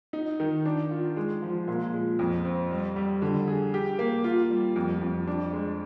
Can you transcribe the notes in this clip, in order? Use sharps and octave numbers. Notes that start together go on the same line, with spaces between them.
D#4
D#3
D4
F4
G#3
F3
A#2
G#3
F2
C4
G3
G3
D3
G#4
G4
A#3
F4
G3
F2
F2
D4
G#3